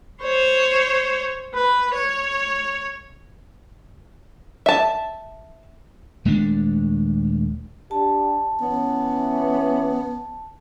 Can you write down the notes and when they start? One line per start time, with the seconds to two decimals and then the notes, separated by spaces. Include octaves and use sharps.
0.22 C5 C#5
1.54 B4
1.95 C#5
4.66 E5 A5
6.25 D#1 G#3 A3 D4
7.91 D4 G4 A5
8.61 E3 B3 C#4